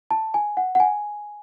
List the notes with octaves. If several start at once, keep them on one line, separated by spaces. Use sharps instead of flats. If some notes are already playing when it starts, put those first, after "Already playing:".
A5
G#5
F#5
F#5
G#5